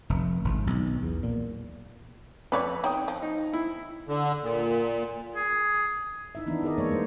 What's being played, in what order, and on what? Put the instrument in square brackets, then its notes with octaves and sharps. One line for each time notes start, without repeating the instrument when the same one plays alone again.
[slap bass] F1
G#1
B1
E2
A#2
[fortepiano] F2 B4 [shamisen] C#5 D5 B5
[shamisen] D#4 [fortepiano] C#5 G5 D#6
[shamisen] F3
[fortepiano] D#4
E4
[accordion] D3
A#2
[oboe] G#4
[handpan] D#4 E4 E5
D#3 E3 B3 D4
D#4 G#4 A#4 D5 D#5
E3 G#3 A#3 C#5
G3 A3 C5